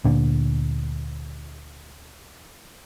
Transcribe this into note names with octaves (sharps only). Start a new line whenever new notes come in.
D2 A#2 D3